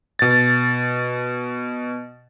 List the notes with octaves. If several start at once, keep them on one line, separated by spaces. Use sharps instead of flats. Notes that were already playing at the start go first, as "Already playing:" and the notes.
B2 A6